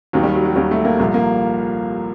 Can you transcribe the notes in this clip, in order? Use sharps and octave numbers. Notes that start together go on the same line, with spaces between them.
D#2 D#3 F#3
G3
F#3
F#3
D#2 D#3 G3
A3
A#3
C2 A#2 F3 A3
A#3